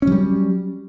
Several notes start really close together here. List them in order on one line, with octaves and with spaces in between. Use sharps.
C#4 F#3 G3